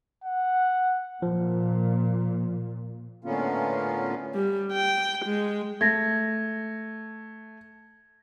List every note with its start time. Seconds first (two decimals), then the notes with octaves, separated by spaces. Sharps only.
0.24 F#5
1.22 A#2 F3
3.24 A2 D3 A#3 B3 C#4 F4
4.34 G3
4.73 G5
5.26 G#3
5.81 A3 G#6 A#6